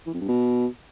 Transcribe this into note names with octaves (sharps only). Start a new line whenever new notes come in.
E3
F2
G2
B2